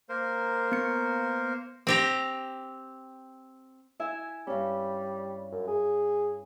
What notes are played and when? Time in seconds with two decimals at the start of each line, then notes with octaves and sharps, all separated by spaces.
0.09 A#3 A#4 C5
0.72 B3 C#7
1.87 C4 G4 A#5
4.00 E4 E5 G#5
4.47 G2 G3 C#4
5.52 F#2
5.67 G#4